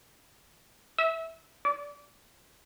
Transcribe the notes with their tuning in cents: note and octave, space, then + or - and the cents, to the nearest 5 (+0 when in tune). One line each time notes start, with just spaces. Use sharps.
E5 -10
D5 -15